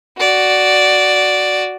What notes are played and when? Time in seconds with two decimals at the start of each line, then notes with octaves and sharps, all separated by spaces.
0.18 F#4 D5